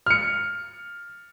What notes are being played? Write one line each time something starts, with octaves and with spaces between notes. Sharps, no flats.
F6 C#7